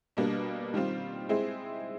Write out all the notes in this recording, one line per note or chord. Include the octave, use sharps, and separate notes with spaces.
B2 G3 A#3 D4
D#3 G3 C4 F4
G#3 C4 E4 G#4